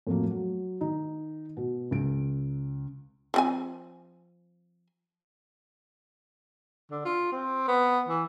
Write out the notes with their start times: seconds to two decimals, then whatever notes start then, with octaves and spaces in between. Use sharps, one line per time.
0.07 F2 A2 F#3 A#3
0.31 F#3
0.81 D#3 D#4
1.57 B2
1.91 C#2 D7
3.34 F3 C4 G#5
6.91 D3
7.05 F4
7.32 C4
7.68 B3
8.08 E3